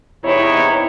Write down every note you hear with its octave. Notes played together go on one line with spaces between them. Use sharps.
E2 C3 D#4 E4 C#5